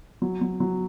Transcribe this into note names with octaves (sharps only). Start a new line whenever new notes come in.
F#3
F#3
F#3